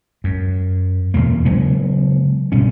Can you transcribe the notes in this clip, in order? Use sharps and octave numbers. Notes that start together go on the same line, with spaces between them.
F#2
E2 G#2 B2 A#3
C#3 F#3 G#3 B3
B2 G3 C#4